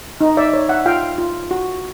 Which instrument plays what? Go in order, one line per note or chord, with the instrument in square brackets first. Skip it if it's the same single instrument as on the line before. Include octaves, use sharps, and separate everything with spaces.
[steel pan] D#4
D5 E5
C#5
E5 F#5
F4 F5 G5
F4
F#4